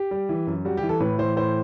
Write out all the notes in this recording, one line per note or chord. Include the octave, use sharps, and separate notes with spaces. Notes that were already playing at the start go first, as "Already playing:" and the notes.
Already playing: G4
G3
E3
F#2
G3 F#4
G4
E3
A4
A2 B4
E3 C5
A2 C5